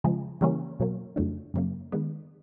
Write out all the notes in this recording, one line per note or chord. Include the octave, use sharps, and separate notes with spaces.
C#3 F3 G#3
C#3 E3 G3 A#3 C#4
B2 F#3 A#3
F2 C#3 F#3 A3 D4
F#2 C#3 F#3 A#3
D#3 G#3 B3